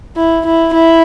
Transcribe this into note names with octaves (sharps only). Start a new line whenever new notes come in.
E4
E4
E4